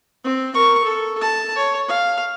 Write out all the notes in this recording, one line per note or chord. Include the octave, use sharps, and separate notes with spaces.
C4
A#4 C#6
A4
A5
C#5
F5